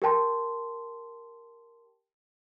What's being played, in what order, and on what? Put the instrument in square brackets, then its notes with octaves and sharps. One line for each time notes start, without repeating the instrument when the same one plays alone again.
[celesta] G4 A#4 G5 A5 C6